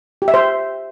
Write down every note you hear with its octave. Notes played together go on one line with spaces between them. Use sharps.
G4
E5
C5